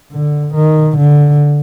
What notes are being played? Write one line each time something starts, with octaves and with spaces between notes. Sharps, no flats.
D3
D#3
D3